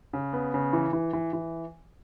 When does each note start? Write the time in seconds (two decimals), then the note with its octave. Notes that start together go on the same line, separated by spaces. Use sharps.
0.13 C#3
0.33 B3
0.54 C#3
0.73 E3
0.93 E3
1.13 E3
1.33 E3